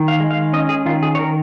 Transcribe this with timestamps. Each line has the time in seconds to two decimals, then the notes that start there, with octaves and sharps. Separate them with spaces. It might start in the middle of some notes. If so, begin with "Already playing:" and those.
Already playing: D#3
0.08 F5
0.20 G#3
0.31 F5
0.53 C#4 D#5
0.69 G#4
0.86 D#3 F4
1.03 G#4
1.15 C#5
1.19 D#3 A#4